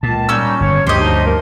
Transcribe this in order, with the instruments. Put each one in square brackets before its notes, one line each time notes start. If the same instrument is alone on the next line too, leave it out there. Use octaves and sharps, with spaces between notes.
[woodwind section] C#2 A5 [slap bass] A#2
[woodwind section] G3 A#3 D#4 [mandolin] C#4 E6
[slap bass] G1 [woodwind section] C#5
[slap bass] D2 G2 [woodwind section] G4 [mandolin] C5 D#5
[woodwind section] F3 G3 D#4
F3 A#3 A#4